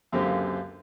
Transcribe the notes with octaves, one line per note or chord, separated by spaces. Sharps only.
C#2 F#2 D3 A#3 C4 G4